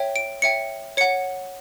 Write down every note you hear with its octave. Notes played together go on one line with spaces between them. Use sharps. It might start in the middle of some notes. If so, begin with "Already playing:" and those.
Already playing: C#5 E5 G5
D7
C#5 E5 G5 C#7
C#5 F#5 C#7